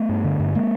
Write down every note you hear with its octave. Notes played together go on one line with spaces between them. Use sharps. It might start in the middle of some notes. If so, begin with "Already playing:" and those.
Already playing: A3 B3
G2
D3
G2
G#3 A#3